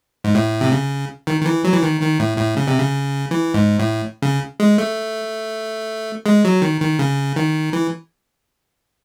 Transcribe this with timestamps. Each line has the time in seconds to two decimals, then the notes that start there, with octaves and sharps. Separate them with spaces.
0.24 G#2
0.35 A2
0.61 C3
0.72 C#3
1.27 D#3
1.41 D#3
1.46 E3
1.64 F#3
1.73 E3
1.83 D#3
2.01 D#3
2.19 A2
2.38 A2
2.57 C#3
2.68 C3
2.79 C#3
3.31 E3
3.54 G#2
3.79 A2
4.22 C#3
4.60 G#3
4.78 A3
6.26 G#3
6.45 F#3
6.62 D#3
6.81 D#3
6.99 C#3
7.36 D#3
7.73 E3